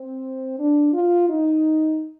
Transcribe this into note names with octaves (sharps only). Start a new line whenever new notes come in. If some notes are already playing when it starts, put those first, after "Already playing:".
Already playing: C4
D4
F4
D#4